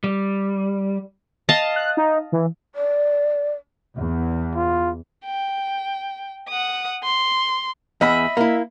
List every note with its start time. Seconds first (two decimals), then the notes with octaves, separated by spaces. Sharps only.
0.04 G3
1.49 D#5 F5 A5
1.76 F#6
1.97 D#4
2.32 E3
2.75 D5
3.98 E2
4.55 F4
5.26 G5
6.49 F#5 D#6
7.04 C6
8.01 E2 D#5 E5 B5
8.37 A#3 E4